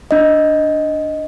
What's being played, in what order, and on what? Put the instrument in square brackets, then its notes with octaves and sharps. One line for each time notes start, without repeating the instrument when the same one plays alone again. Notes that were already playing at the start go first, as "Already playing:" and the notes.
[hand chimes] D4 D#5